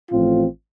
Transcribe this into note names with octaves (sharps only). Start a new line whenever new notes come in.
A1 A2 F3 C4 F4